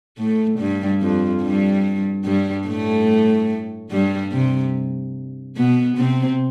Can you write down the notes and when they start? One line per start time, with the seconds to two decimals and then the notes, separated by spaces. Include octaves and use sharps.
0.18 A2 A3
0.59 G2 G3
1.01 F2 F3
1.42 G2 G3
2.24 G2 G3
2.67 A2 A3
3.91 G2 G3
4.32 C3
5.56 B2 B3
5.97 C3 C4